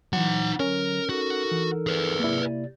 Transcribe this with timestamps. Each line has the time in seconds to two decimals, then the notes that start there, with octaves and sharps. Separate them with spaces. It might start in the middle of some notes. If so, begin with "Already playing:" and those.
0.13 E3 F#3 D#4 F#5
0.60 D3 F#3 C#4 A#4
1.09 D#4 F#4 A4 A#4
1.52 E3
1.87 G#4 B4
2.20 C3 A#3 E4 D5